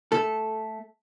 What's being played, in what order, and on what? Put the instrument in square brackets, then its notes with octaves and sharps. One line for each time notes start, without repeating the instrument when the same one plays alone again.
[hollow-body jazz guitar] A3 A4